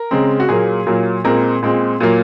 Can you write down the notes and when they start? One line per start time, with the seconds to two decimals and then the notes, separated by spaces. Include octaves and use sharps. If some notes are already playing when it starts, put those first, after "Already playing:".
Already playing: A#4
0.11 C#3 G#3 C4
0.40 F#4
0.49 A#2 F#3 A#3 G#4
0.86 A#2 F#3 A#3
1.24 A#2 G#3 C4 A#4
1.63 A#2 G#3 C4
2.00 A#2 F#3 A#3